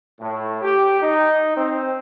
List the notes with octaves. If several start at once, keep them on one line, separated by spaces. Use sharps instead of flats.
A2
G4
D#4
C4